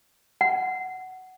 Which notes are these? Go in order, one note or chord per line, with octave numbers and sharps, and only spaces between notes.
F#5